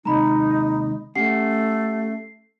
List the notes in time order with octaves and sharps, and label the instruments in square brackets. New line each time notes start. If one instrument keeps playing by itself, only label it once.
[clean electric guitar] D#2 C3 G#3 [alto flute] D#4 [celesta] A#5 B5
[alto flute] A3 [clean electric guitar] C#4 G4 F#5 [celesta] C7